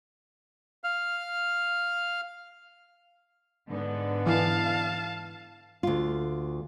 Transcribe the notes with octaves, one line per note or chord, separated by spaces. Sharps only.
F5 F6
G#2 D3 B3
E3 F5 A5
D2 F4